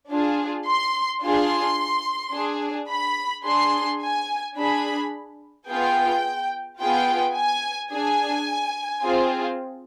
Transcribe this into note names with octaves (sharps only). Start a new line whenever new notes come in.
D4 F4 G#4
C6
D4 F4 G#4 C6
D4 G#4
B5
D4 G#4 C6
G#5
D4 G#4 B5
B3 F4 G#4 G5
B3 F4 G#4 G5
G#5
D4 G#4 G#5
C4 F4 G#4